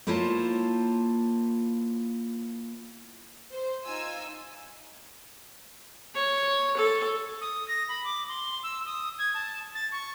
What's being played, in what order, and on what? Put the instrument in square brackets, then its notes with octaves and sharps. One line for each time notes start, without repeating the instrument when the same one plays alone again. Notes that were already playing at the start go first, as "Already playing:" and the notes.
[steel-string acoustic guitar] A#3 E4 F4 C5 C#5 A5
[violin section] C5
D#4 F4 G#5 E6
[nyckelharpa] C#5
A4
[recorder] D#6
A#6
B5
D6
C6
E6
D#6
G#6
A5
A6
C#6